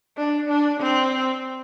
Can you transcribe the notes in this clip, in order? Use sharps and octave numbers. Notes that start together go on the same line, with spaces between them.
D4
D4
C4